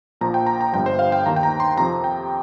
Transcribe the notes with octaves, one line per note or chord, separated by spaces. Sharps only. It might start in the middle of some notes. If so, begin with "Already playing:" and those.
A#1 A#2 F3 A#5
G5
A#5
A#5
G1 G2 F3 G5
C5
F5
G5
D#2 D#3 A#5
G5
A#5
C6
F2 C3 F3 A#5
G5